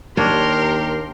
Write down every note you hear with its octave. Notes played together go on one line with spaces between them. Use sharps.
D#2 A#3 D4 G4 A#4 C#5 C6